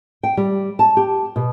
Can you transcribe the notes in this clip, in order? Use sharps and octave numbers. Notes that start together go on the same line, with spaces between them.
G5
G3
A5
G4
B2